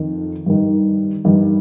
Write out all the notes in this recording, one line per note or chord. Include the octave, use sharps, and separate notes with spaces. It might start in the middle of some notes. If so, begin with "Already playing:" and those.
Already playing: F2 D#3
G2 D#3
G2 D#3